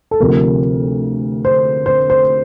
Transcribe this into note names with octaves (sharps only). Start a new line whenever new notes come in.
A4
D2 C3 F3 A3 A#4
C5
C5
C5